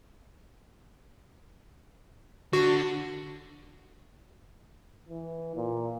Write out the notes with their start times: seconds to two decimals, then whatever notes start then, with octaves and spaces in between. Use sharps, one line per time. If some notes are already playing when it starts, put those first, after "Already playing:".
2.53 D3 F#4
5.09 E3
5.56 A#2